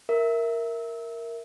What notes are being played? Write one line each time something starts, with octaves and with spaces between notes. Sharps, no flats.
A#4 E5